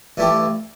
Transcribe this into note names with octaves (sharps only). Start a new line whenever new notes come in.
G2 E3 A3 E4 G4